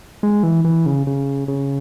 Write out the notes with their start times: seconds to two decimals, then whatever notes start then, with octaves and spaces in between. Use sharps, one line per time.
0.23 G#3
0.43 E3
0.65 E3
0.86 C#3
1.07 C#3
1.48 C#3